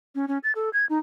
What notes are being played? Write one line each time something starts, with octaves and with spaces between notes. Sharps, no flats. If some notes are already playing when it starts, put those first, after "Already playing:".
C#4
C#4
A6
A4
G#6
D#4